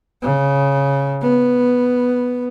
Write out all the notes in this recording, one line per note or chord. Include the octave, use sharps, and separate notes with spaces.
C#3
B3